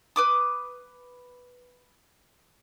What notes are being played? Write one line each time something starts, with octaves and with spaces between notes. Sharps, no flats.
B4 D6 D#6